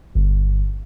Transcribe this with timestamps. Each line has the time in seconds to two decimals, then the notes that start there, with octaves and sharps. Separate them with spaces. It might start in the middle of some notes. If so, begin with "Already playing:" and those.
0.15 G1